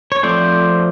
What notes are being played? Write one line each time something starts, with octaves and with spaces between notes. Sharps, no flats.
C#5
F3 A3 C4 C5 D5